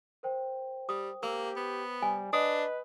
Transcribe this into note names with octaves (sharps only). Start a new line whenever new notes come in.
A#4 C5 G5
G3 D#6
A#3 G4 E6
B3
G3 G#5
D4 B4 D#5 D#6